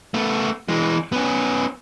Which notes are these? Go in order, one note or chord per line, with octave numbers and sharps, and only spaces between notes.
A3 B3
E3 G#3
B3 C#4